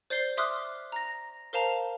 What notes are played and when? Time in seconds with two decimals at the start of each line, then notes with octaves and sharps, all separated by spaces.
0.10 C5 D5 G6 C7 G7
0.37 E5 C6 D6 D#6 F6 F#6
0.92 A#5 A#6
1.53 A#4 C5 F5 A5 A#5